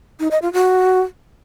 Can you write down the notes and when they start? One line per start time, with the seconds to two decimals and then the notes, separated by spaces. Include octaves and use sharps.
0.20 D#4
0.31 D#5
0.42 F4
0.53 F#4